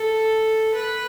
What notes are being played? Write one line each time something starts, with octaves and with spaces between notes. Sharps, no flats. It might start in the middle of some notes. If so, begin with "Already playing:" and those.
Already playing: A4
B4